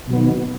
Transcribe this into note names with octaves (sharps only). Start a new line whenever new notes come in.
B2 D#3 F#3 B3